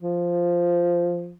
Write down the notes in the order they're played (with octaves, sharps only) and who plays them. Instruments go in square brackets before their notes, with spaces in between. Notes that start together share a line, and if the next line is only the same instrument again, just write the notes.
[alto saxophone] F3